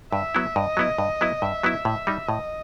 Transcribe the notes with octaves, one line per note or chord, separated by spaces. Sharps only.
G2 E5
F#3 B3 E4
G2 D#5
F#3 B3 E4
G2
F#3 B3 E4
G2 E5
F#3 B3 E4
A2
G3 D#4
A2 D#5